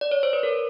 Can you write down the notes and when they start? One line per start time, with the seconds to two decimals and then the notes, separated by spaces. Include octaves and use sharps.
0.01 D5
0.11 C#5
0.23 C5
0.33 B4
0.43 A#4